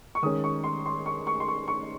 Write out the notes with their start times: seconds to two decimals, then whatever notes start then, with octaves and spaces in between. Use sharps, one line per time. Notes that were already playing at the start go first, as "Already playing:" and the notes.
0.15 C#6
0.23 D#3 G#3 C#4 D#6
0.44 C#6
0.64 C6
0.86 C6
1.06 C#6
1.27 C#6
1.40 C6
1.48 C#6
1.68 C#6